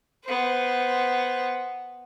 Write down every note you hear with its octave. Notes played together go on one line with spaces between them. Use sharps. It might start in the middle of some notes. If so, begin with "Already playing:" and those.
B3 C5